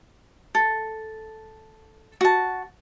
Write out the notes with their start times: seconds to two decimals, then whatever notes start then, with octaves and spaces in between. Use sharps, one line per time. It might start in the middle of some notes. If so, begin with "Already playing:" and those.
0.55 A4
2.21 F#4 A5